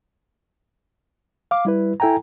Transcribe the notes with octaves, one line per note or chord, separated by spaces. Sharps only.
F5 D6
G3 E4 B4
E4 A4 G5 G#5 A#5